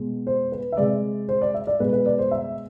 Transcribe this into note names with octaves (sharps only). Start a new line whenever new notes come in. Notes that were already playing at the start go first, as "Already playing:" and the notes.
Already playing: B2 G#3
C5
B4
E5
C3 G#3 D5
C5
D5
E5
D5
B2 G#3 B4
B4
D5
C5
E5